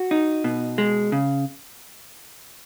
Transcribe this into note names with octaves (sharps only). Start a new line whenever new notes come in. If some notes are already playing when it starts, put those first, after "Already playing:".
Already playing: F#4
D#4
B2
G#3
C#3